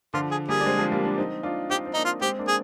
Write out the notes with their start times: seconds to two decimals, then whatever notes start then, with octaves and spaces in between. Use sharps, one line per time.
0.14 D3 F3 F4
0.31 G#4
0.48 G3 A#3 G#4
0.60 D4
0.66 G#3 C4
0.79 F3 G#3
0.92 G3 A#3
1.05 A#3 D4
1.18 C4 D#4
1.43 D4 F4
1.70 C4 D#4 G4
1.86 C4
1.94 A#3 D4 D#4
2.04 F4
2.21 G#3 C4 G4
2.39 A#3 D4
2.48 G#4